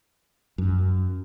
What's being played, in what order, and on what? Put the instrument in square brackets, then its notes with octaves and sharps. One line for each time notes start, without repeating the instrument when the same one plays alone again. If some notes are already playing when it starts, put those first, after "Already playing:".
[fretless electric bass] F#2